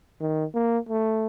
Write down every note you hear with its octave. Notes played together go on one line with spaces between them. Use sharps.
D#3
A#3
A3